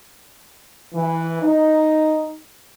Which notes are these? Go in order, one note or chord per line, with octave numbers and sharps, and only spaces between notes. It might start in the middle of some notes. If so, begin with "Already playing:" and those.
E3
D#4